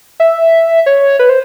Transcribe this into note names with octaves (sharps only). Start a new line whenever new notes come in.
E5
C#5
B4
C5